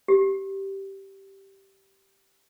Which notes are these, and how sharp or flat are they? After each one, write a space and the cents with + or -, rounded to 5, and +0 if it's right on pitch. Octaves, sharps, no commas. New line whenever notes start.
G4 -10